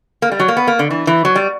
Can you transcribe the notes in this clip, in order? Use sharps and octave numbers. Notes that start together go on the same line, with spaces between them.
A#3
G3
F#3
A#3
B3
A#3
D3
E3
E3
F#3
G3